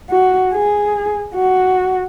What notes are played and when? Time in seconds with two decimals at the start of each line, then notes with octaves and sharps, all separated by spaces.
0.10 F#4
0.53 G#4
1.34 F#4